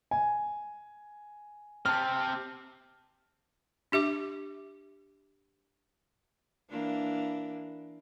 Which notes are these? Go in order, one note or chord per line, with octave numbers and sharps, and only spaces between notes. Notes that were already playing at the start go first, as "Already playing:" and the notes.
G#5
C3 C4 A5 F6
D4 G4 E5 D6
E3 A#3 D4